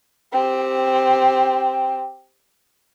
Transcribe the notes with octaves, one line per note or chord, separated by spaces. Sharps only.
C4 G4